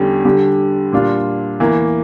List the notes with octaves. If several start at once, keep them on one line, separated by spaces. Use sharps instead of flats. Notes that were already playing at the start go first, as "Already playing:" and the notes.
Already playing: E2 D3 G3 C#4 G4
D3 G3 D4 G4
A#2 G3 D4 F4
E2 E3 A#3